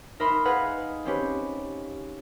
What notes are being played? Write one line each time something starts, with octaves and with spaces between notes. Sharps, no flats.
D#4 A#4 D#5 E5 B5 C6
G#4 B4 F5 F#5
C4 C#4 G4 B4